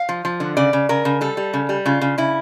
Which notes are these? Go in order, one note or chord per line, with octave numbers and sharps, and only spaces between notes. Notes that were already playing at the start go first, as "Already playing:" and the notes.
Already playing: F5
F3
F3
D3
C#3 D5
C#3
C#3 A#4
C#3
G3 A4
G3
C#3
G3
C#3 F4
C#3
C#3 E4